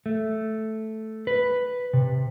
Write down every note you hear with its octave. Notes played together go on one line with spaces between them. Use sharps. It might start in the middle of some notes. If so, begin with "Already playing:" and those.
A3
B4
C3